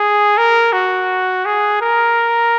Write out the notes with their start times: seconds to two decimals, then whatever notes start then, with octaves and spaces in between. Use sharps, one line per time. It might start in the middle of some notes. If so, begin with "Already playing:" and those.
Already playing: G#4
0.37 A#4
0.73 F#4
1.45 G#4
1.81 A#4